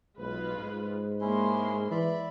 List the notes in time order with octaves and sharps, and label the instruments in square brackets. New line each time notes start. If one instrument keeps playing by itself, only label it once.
[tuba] B1 [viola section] G#3 F4 B4
[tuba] G#2
[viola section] G#3 A#3 C6 [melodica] C#4 E4
[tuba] E3 [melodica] D5 E5 B5